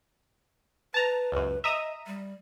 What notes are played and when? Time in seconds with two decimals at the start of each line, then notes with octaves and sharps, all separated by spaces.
0.94 B4 A5 A#5
1.32 C#2 F#2
1.64 D#5 E5 A#5 D#6
2.07 G3